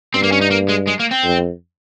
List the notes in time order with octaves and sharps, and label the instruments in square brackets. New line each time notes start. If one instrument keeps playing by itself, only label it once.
[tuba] G2 [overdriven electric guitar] C4
[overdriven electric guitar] A#3
C#4
D#4
A#3
G#3
G#3
A#3
C4
[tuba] F2